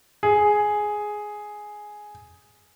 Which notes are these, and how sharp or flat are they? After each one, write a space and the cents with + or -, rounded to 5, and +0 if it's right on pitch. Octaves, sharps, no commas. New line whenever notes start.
G#4 +5